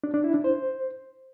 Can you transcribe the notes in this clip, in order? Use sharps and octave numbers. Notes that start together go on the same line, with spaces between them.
D4
D4
E4
D4
C5